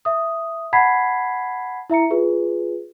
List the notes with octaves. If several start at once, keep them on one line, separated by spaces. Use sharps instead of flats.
E5 D#6
F#5 A5 B5 G#6 B6 C7
E4 E5 A#5 C#7
F4 G#4 B4